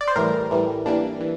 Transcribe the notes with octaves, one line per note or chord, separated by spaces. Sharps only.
D5
C5
A2 E3 G3 A#4
A2 E3 G3
E3 G3 A#3 D4
E3